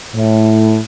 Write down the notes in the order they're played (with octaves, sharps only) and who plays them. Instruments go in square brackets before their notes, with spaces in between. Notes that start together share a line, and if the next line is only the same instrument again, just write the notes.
[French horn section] A2